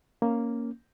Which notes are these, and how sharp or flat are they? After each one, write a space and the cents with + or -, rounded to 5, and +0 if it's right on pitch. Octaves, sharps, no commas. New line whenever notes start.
A#3 +0 C#4 +0